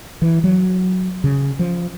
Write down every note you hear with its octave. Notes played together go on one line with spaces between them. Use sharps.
E3
F#3
C#3
F3